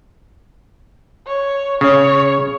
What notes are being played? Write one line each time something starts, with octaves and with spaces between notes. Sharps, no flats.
C#5
C#3 C#5